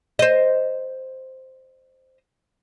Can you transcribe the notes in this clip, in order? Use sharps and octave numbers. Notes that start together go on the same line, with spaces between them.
C5 D#5